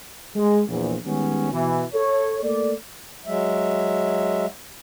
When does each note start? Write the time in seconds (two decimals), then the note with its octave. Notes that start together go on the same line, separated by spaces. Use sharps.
0.36 G#3
0.68 A#1 E2
1.06 D#3 G3 G#3 B3 C#4
1.52 B2 E3
1.94 A4 C#5
2.44 A3 A#3 A4 D5
3.26 F#3 G#3 E5